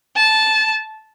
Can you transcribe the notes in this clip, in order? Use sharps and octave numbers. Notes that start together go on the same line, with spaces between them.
A5